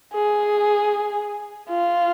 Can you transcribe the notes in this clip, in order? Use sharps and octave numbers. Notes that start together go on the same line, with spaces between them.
G#4
F4